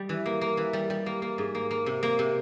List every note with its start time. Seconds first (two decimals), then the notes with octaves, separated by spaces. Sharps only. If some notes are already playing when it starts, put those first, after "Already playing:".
Already playing: G3
0.09 E3
0.26 A#3
0.41 A#3
0.57 E3
0.73 G3
0.90 G3
1.06 A#3
1.22 A#3
1.38 G#2
1.55 A#3
1.71 A#3
1.86 C3
2.03 A#3
2.19 C3